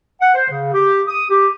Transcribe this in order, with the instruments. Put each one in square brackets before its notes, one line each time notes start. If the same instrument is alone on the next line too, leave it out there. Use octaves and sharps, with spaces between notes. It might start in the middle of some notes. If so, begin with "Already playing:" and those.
[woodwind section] F#5
C5
C#3
G4
D#6
G4